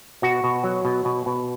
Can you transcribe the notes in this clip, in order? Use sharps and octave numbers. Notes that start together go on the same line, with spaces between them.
B2 F#4
B2
F#3
B2
B2
B2